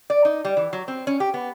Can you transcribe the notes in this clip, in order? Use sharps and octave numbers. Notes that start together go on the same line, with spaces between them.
D5
D#4
G3
E3
F#3
C4
C#4
G4
B3